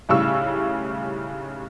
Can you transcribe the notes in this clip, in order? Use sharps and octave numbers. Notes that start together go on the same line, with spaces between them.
B1 A2 C#3 G3 C#6 E6